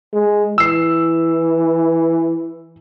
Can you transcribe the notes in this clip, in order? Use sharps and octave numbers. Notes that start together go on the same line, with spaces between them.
G#3
E3 E6 C7